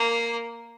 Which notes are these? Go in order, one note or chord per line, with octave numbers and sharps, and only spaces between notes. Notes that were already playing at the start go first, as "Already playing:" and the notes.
Already playing: A#3